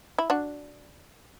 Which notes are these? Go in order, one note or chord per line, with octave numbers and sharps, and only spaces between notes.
E4
D4 F#4